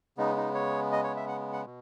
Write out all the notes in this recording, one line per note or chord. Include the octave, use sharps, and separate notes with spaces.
C#3 G#3 B3 D#4
D#4
C#5
D#5
C#5
E5
F#5
F#5
B2